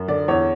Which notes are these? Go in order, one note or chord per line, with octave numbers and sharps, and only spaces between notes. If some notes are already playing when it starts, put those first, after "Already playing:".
Already playing: F#2
D3 D5
E2 C#5